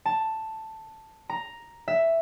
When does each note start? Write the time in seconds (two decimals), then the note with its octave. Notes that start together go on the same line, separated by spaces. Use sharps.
0.05 A5
1.30 A#5
1.88 E5